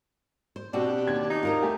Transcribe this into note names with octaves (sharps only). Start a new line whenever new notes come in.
C5
B2 C4 D4 F#4 G4
D#2 G#6
D#4
F4 A#4 C5
A3 G4 G#5